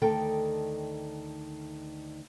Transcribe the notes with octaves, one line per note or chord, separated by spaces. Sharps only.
D2 D#3 A4 G5